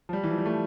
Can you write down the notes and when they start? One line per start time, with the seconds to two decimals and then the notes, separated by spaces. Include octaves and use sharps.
0.09 F3
0.13 G3
0.24 E3
0.30 F3
0.38 G3
0.46 A3